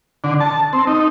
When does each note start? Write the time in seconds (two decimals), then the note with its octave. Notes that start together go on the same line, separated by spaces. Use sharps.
0.24 D3
0.40 A5
0.73 C4
0.87 D#4